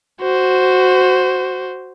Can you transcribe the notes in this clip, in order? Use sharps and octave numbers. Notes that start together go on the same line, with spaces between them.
F#4 C5